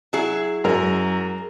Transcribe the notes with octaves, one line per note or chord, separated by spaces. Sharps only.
F#3 E4 G#4
F#2 G#3 A#4